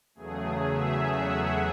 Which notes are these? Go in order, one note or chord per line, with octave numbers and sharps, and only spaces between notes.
E2 C#3 F#3 A3 G#4
E5
F#5